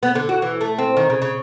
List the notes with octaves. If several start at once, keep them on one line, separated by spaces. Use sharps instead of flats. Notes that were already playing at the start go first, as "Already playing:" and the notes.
B3
D3
F#4
E3
A3
C4
D#3
C#3
C#3